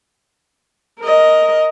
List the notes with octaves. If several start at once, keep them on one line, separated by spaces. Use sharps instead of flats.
A#4 D#5